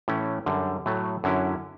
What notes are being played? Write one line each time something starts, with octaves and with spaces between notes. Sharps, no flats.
A2 E3 A3 C#4 E4
F#2 D3 G3
A2 F#3 A3
F#2 D3 F#3 C#4 E4